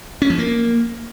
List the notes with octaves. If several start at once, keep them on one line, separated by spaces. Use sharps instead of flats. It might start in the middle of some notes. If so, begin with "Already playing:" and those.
C#4
F3
A#3